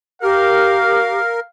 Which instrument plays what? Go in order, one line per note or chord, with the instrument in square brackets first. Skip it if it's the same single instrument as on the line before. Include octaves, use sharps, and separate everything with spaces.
[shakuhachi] G4 [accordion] A#4 [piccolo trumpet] F5